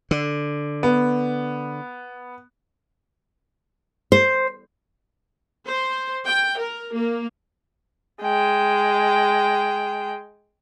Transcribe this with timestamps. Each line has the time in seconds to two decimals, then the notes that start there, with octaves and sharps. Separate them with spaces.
0.11 D3
0.83 B3
4.12 C5
5.66 C5
6.26 G5
6.57 A#4
6.95 A#3
8.22 G#3 G5